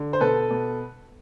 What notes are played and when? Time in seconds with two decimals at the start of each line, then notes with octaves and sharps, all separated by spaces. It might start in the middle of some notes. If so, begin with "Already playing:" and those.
Already playing: D3
0.13 C5
0.20 B2 A4 B4
0.51 B2